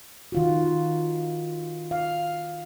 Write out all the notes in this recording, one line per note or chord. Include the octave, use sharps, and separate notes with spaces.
D#3 F4 F#4
F5